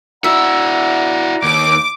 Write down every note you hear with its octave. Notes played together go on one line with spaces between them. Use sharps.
E4 F#4 D5 E5 F#5 A#5
D#2 D6